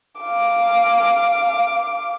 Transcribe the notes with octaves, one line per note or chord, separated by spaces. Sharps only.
F5 D6